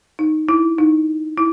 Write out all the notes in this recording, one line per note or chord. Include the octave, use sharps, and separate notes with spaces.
D#4
E4
D#4
E4